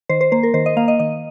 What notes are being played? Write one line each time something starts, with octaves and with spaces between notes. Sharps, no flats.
D#3 C5
C5
A#3 C5
A#4
D#3 C5
D#5
A#3 F5
D#5
D#3 D#5